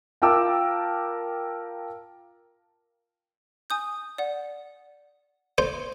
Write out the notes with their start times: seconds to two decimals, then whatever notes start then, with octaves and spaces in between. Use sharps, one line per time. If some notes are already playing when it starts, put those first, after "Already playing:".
0.22 F4 A#4 G5 A5 D6 E6
3.70 G#5 D#6 G6
4.18 D5 F#5
5.58 C5